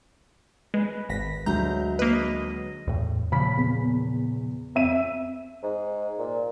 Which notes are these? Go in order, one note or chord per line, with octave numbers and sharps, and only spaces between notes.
G#3 B4
G#1 A#6 B6
D2 F#3 G#3 A#5 G6
A#3 B4 D#5
E2 A2
A#2 C#3 F3 B5 B6
E2
F2 E5 D#7
G#2
A#2